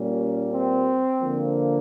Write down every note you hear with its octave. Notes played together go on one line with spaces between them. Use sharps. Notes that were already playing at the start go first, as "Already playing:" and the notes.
Already playing: A#2 G3 A#3 C#4
C4
D3 F3 A#3